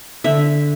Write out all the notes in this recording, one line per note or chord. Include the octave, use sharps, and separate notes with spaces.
D3 E5